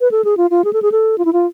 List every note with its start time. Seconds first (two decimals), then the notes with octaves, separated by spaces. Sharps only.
0.01 B4
0.11 A4
0.24 G#4
0.37 F4
0.50 F4
0.64 G#4
0.73 A4
0.82 G#4
0.92 A4
1.18 F4
1.25 E4
1.33 F4